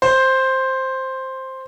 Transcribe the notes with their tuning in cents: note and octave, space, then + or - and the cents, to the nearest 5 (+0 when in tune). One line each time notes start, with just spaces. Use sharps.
C5 +5